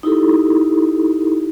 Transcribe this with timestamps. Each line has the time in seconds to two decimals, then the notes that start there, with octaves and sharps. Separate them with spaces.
0.03 D#4 E4 G4 A4